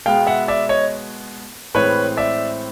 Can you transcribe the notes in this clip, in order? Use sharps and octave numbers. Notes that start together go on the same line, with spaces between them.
B2 G#3 B3 F5 G5
E5 F#5
D5 E5
C#5 D#5
A2 E3 G#3 C4 B4 C#5
D5 E5